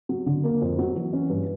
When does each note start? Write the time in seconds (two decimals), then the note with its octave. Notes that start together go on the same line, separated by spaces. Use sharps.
0.09 F#3
0.26 D3
0.44 A#3
0.62 F2
0.79 F#3
0.96 E3
1.13 C#4
1.30 G2